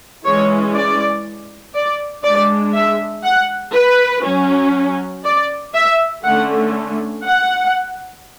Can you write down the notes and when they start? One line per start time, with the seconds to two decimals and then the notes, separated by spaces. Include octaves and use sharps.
0.24 E3 G#3 C#4 C#5
0.74 D5
1.75 D5
2.24 G#3 D4 D5
2.74 E5
3.24 F#5
3.74 B4
4.24 F#3 C#4
5.24 D5
5.74 E5
6.23 D3 A3 C#4 F#5
7.24 F#5